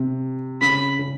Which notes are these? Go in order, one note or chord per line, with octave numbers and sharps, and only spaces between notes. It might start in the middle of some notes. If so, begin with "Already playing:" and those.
Already playing: C3
C#3 B5
C#3